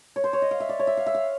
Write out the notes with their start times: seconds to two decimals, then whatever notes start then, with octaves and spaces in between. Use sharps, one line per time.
0.16 C#5
0.24 C5
0.33 C#5
0.42 D#5
0.51 F5
0.60 E5
0.69 D5
0.79 C#5
0.87 E5
0.97 F5
1.06 E5
1.14 F5